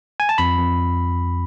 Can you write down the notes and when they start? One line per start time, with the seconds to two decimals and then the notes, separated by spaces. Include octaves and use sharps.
0.20 G#5
0.29 A5
0.38 F2 B5
0.58 F2